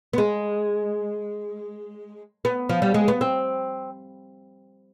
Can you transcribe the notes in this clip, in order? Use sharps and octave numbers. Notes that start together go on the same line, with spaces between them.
B3
G#3
B3
F3
G3
G#3
B3
C4